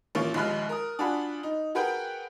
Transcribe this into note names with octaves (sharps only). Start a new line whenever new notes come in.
A1 A#3 C#4 F4 C#6
A#1 D#2 G#3 B5 F6 F#6
A#4 D#6
D4 F4 F#4 G#5 B5
D#4
F#4 G#4 A#4 B4 F#5 G5